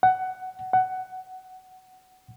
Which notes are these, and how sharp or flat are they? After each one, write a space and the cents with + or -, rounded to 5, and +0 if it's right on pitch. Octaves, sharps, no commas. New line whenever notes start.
F#5 +15
F#5 +15